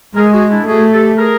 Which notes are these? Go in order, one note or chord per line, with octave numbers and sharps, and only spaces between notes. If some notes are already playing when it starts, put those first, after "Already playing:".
G#3 G#4 A#4
F#4 G#4
D4 E4
A3 F#4 G#4
G4 A4
G#4 A#4